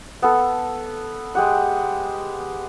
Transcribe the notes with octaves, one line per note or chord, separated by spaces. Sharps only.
B3 A4
G#3 G4 F#5